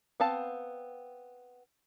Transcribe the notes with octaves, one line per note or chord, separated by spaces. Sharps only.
B3 C4 F5 A5